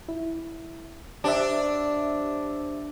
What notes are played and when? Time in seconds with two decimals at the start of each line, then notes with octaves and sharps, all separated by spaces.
0.08 E4
1.24 D4 G4 C5 E5